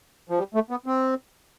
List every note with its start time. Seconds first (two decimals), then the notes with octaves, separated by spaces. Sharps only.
0.30 F3
0.38 G3
0.55 A3
0.71 B3
0.86 C4